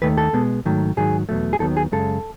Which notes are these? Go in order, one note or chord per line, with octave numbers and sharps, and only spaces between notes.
D#2 D#3 A3 B4
A4
B2 G#3 B3
G#2 D#3 F#3 A3
G#2 D#3 F#3 G#4
E2 B2 F#3 A3
G#4
D#2 D#3 F#3 B3 A4
G#4
F#2 C#3 G#3 A4